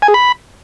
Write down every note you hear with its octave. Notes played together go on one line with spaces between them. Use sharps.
G#5
G#4
B5